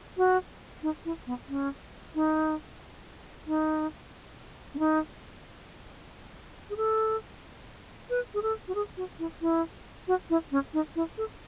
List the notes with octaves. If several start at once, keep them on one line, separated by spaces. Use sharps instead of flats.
F#4
D#4
E4
B3
C#4
D#4
D#4
C#4
D#4
G#4
A4
B4
G#4
A4
F#4
G#4
F#4
E4
E4
F#4
E4
C#4
D#4
E4
A4